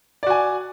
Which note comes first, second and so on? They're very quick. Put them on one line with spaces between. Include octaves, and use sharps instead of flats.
D5 F#4 G#5